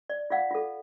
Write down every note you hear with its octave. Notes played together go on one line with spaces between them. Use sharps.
D5
F4 D5 F5 F#5
F4 A4